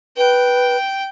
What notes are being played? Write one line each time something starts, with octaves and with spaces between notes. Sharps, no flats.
B4 G5